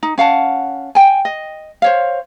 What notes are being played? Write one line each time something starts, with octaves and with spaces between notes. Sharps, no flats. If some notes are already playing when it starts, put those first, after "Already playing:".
D#4
C#4 F5 F#5 A5
G5 G#5
D#5
C5 C#5 F5